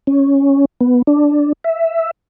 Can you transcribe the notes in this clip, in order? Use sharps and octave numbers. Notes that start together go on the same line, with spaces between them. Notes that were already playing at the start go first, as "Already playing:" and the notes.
C#4
B3
D4
E5